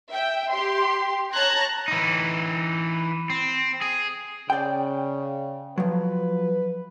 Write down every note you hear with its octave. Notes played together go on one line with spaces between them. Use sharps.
E5 G5
G4 C6
C#5 A5 A#5 F#6 G#6 A#6
E3 D#4
C4
G#4
C#3 D5 G5
F3 F#3 B4